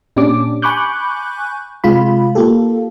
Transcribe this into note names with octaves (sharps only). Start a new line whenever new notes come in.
A#2 C#4 D4 G4 D6
G#5 B5 C#6 D6 F#6 G6
C3 G#3 F4 B5
A#3 F4 G4 A4